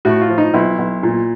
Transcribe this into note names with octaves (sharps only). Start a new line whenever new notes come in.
A2 F#4
F4
F3
D#4
B1 E4
B1
A#2